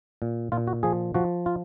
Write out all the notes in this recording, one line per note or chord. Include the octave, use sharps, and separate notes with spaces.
A#2
A#2 F4
F#4
F3 G#4
F3 F#4
F4